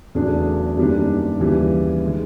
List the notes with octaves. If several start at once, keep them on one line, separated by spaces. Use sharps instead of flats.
E2 C#3 F#3 A3 D4
F#2 D#3 G3 A#3 D4
D#2 C#3 E3 G3
D#3 G#3